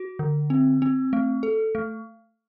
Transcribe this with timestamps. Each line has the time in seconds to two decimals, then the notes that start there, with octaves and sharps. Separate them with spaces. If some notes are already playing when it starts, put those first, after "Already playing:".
Already playing: F#4
0.19 D3
0.50 C4
0.82 C4
1.13 A3
1.43 A4
1.75 A3